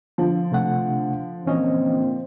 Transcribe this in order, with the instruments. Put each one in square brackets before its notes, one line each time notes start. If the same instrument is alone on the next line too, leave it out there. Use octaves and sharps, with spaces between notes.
[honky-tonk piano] D3 F3
[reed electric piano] C3 A3 F#5
[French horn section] A#2 C4 [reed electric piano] E3 C#4 D#5